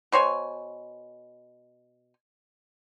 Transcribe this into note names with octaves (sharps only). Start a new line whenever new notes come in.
B2 C5 C#5 G#5